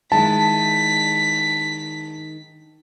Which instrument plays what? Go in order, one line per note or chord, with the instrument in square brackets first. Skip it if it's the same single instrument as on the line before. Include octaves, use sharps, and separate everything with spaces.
[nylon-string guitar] D#3 G#3 E4 [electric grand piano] A5 [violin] B6